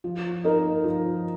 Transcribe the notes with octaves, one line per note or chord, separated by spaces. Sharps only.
F3
D#4 A#4 D#5
F3